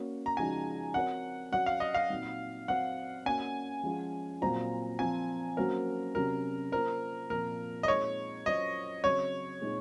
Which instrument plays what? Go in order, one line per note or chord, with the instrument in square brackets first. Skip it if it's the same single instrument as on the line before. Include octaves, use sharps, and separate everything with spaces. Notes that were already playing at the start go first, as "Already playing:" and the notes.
Already playing: [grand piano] A#3 C#4 F#4 C#5
[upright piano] A#5
[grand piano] C#3 F3 G#3 D#4 F#4 [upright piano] G#5
[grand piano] C4 F#4 A#4 C#5 [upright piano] F#5
[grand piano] F#3 C#4 F#4 C#5 [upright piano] F#5
[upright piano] F5
D#5
F5
[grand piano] A#2 F#3 C4 D#4 F#4
[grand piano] F#3 C4 F#4 C5 [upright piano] F#5
[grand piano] A#3 C#4 F#4 C#5 [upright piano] G#5
[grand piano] F3 G#3 C#4 F4
[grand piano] A#2 F#3 C4 F4 C5 [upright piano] A#5
[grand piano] F3 C4 F4 [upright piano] G#5
[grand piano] F#3 A#3 C#4 F#4 C5 [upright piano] A#4
[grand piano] C3 F#3 C#4 F#4 [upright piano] A#4
[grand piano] A#3 F4 C5 [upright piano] A#4
[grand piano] A#2 F3 C4 [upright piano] A#4
[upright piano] D#5
[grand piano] A#2 G#3 C4 D#4 [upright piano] C#5
[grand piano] F#3 C#4 F4 C5 [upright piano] D#5
[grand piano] C#3 F#3 C4 [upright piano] C#5
[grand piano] A#2 G#3 C4 D#4